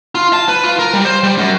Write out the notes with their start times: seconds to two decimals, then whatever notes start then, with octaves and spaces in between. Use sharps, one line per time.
0.15 F4
0.33 A5
0.49 B4
0.64 F4
0.79 A#4
0.94 G3
1.05 C5
1.23 G3
1.38 F#2